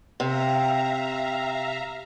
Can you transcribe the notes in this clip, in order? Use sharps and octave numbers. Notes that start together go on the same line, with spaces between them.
C3 E5 F5 A#5